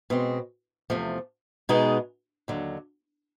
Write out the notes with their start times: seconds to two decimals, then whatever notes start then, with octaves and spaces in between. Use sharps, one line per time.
0.10 B2 G#3 C4
0.90 E2 C3 F3 A3
1.69 B2 G#3 B3 D#4 G#4
2.48 D#2 D3 F#3